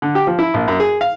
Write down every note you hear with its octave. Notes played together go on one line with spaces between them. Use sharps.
D3
G4
F3
E4
A#1
F#2
G#4
F5